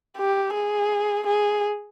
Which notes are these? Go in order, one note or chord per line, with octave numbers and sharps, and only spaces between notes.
G4
G#4
G#4